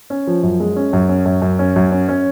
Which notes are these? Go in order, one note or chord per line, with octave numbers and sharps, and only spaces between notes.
C#4
F3
F#2
G#3
C#4
F#2
C#4
F#2
F#2
C#4
F#2
C#4
C#4